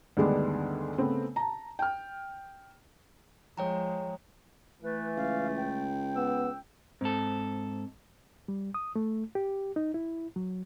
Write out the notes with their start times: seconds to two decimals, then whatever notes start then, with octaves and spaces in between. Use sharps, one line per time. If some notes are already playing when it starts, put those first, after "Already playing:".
0.17 D2 G2 D#3 G#3 B3 D4
0.98 C#3 A3 B3 C4
1.36 A5 A#5
1.79 G5 F6
3.58 F3 G#3 C#5 G5 A#5
4.82 E3 A3 B4
5.16 C#2 F5
5.57 G5
6.16 B3 E6
7.01 G#2 C4 A4
8.48 G3
8.74 D#6
8.96 A3
9.35 G4
9.76 D#4
9.94 E4
10.36 F#3